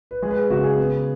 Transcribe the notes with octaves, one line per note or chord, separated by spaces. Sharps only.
B4
G#3 G#4
B4
G#4
C#3 F#4
G#4
B3